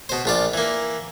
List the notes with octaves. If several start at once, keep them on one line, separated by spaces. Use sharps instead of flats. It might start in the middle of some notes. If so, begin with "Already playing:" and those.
B2 C5
A#1 F4 D5
E3 A#3